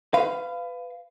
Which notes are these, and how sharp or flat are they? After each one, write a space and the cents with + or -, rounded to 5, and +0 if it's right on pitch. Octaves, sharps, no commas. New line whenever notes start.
B4 +25 F5 -15